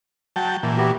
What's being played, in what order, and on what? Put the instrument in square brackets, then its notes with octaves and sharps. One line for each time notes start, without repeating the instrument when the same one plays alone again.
[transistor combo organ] F#3 G5 A5
A#2 E3
[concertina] B3 F#4 G4